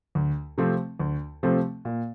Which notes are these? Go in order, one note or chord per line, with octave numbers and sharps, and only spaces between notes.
D2
C3 F3 A3 C4
D2
C3 F3 A3 C4
A#2